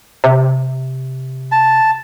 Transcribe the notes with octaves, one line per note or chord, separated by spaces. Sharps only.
C3
A5